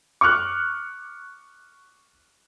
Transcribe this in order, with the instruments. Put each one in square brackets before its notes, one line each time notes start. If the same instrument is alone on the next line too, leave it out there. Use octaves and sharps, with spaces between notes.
[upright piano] C#6 D6 F6 F#6